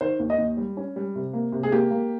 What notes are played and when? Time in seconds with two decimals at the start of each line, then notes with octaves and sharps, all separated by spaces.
0.01 D#3 C5
0.19 D#2
0.30 D#5
0.38 D#2
0.57 G3
0.77 C#4
0.96 G3
1.15 C3
1.33 A#3
1.52 C3
1.63 G#4
1.71 A#3 G4
1.91 A#3